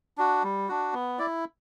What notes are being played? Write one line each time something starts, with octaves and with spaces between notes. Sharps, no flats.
D4 F#4
G3
D4 F#4
B3
E4 D5